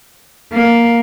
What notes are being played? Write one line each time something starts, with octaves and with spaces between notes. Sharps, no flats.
A#3